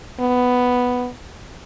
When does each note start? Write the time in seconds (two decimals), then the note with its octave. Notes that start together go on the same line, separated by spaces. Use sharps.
0.20 B3